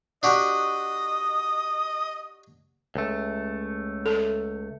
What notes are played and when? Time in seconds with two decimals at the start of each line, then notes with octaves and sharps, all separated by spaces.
0.23 D4 F#4 G4 D#5
2.95 C#2 A3
4.06 A4